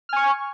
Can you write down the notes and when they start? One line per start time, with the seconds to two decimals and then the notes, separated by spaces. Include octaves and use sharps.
0.09 F6
0.13 G#5
0.16 C#6